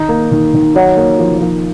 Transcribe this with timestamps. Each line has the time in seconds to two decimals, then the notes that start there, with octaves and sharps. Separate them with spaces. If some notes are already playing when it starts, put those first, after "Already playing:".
Already playing: D#3 D#4
0.09 A#3
0.32 D#3
0.54 D#3
0.75 F#3 D#4
0.97 A#3
1.19 F3
1.41 F3